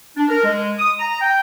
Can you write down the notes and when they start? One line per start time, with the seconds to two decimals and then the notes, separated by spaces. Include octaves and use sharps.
0.17 D4
0.29 A#4
0.44 G#3
0.78 D#6
1.00 A#5
1.22 G5